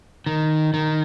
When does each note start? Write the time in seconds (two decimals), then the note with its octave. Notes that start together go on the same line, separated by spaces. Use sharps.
0.26 D#3
0.74 D#3